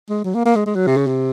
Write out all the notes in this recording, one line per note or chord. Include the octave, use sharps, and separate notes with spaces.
G#3
F#3
A#3
A#3
G#3
G#3
F#3
C3
C#3
C3